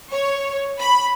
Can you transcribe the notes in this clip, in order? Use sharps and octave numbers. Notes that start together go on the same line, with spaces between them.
C#5
B5